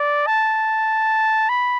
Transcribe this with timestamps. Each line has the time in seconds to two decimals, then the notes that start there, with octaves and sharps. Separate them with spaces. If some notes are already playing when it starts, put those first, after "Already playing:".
Already playing: D5
0.27 A5
1.49 B5